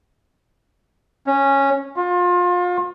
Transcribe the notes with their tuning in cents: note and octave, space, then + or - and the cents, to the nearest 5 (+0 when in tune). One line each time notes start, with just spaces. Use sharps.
C#4 -10
F4 +30